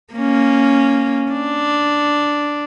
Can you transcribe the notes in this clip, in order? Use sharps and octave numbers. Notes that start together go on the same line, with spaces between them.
A#3 C#4
D4